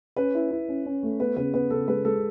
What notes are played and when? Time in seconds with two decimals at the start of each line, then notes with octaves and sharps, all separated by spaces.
0.16 C#4 B4
0.35 E4
0.51 E4
0.68 C#4
0.86 C#4
1.03 A3
1.20 B3 B4
1.36 C#3 B4
1.54 B3 B4
1.70 C#3 A4
1.88 G#3 B4
2.05 G#3 A4